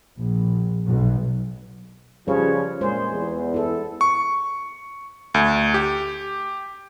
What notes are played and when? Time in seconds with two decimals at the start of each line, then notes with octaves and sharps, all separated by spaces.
0.18 A#1
0.86 B1
2.28 C#3 F3 G3 B4 C#5
2.81 A#2 G#3 G#4 C5
3.12 E2
3.54 E4 A4
4.01 C#6
5.34 D2
5.74 G4